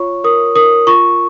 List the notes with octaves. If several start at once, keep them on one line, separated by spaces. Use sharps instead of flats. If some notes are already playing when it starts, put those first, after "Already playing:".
Already playing: F4 C#5 C#6
A#4 D#6
A#4 D#6
F4 C#6